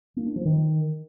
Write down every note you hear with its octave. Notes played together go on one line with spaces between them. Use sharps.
A#3
D4
F3
D#3